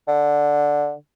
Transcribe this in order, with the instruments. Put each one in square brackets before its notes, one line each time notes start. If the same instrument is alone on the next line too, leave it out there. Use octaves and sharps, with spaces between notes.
[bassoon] D3